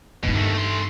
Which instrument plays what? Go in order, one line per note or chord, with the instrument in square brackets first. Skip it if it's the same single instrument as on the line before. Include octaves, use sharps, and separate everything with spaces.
[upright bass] G2 D#4 [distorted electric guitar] B2
[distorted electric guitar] D#2 A3
A3 C6